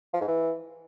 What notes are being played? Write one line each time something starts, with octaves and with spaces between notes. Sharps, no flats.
F3
G#2
E3